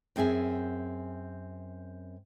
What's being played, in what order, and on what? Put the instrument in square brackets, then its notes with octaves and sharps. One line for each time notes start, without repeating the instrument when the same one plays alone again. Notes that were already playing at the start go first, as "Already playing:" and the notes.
[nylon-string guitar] F#2 C4 G#4 E5 G#5